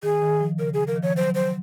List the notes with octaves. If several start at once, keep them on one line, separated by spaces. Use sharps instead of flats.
D#3 G#4
D#3
F3
C#3 A#4
G#4
F3 A#4
D#3
F3 C#5
F#3 C5
F#3 C5